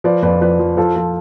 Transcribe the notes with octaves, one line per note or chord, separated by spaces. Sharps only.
F3 B4 D5
F2 B4 D5
F3 B4 D5
F3
F3 A4
F3